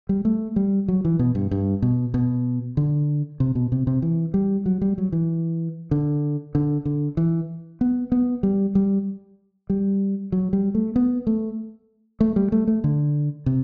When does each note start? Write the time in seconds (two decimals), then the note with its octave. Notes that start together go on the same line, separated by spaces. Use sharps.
0.09 G3
0.25 A3
0.56 G3
0.88 F#3
1.05 E3
1.19 B2
1.35 G2
1.51 G2
1.82 B2
2.14 B2
2.77 D3
3.40 C3
3.55 B2
3.72 C3
3.87 C3
4.02 E3
4.34 G3
4.66 F#3
4.81 G3
4.98 F#3
5.12 E3
5.91 D3
6.55 D3
6.85 D3
7.17 E3
7.81 B3
8.12 B3
8.43 G3
8.75 G3
9.70 G3
10.32 F#3
10.53 G3
10.75 A3
10.96 B3
11.27 A3
12.20 A3
12.36 G3
12.52 A3
12.67 A3
12.84 D3
13.46 C3